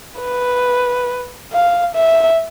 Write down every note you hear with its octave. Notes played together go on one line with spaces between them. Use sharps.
B4
F5
E5